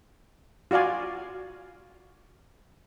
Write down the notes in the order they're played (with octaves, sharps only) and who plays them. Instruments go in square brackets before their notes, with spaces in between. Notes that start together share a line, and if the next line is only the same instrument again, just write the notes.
[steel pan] F4 F#4 D5 F5 G#5